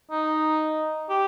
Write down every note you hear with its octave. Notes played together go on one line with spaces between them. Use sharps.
D#4
G4